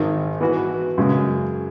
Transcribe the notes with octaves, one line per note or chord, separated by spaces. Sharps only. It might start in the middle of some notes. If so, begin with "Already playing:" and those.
Already playing: G#1 G#2 D#3
E3 B3 F#4
F#2 C#3 G#3